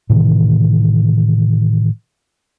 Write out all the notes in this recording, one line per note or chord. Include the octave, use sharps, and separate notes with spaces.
A2 C3 D#3 E3